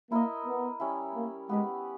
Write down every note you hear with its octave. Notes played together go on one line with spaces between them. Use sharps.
A#3 E4 A#4 D#5
B3
G3 C#4 E4
A#3
G#3 B3 G4 B4